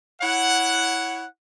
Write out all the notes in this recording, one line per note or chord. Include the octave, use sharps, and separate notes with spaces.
E4 C#5 F#5